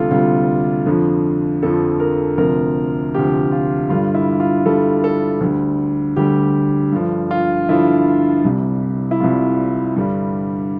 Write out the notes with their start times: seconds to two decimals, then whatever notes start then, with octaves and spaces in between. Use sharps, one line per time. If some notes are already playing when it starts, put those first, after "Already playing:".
Already playing: D2 C3 G3 F4 A4
0.11 D2 C3 G3 F4
0.86 F2 D3 F3
1.63 F2 D3 F3 A4
2.00 A#4
2.37 D2 C3 F3 A#4
3.14 D2 C3 F3 G4
3.52 F4
3.89 G2 D3 G3 F4
4.15 E4
4.40 F4
4.65 G2 D3 G3 A4
5.04 A4
5.41 D2 D3 G3
6.16 D2 D3 G3 G4
6.92 G2 D3 F3
7.31 F4
7.69 G2 D3 F3 E4
8.44 C2 C3 G3
9.11 E4
9.20 C2 C3 G3 F4
9.96 G2 D3 G3